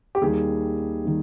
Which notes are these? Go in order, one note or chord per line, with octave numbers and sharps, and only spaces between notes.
G4
D#2 D#3 G3 G#4
D#3 G3